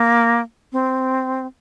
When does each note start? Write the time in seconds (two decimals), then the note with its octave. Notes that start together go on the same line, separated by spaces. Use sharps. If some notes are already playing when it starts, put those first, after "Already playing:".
Already playing: A#3
0.72 C4